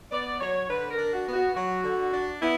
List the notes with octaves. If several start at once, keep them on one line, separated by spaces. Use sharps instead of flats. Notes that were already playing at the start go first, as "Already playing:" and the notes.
B3 D5
F#3 C#5
D3 B4
A#4
D4
F#4
B3
F#4
F#3 F#4
D3
D4
B3 E4